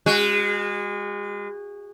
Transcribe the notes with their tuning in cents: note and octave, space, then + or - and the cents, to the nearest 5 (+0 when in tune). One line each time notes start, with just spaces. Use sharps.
G#3 -30 F#4 +0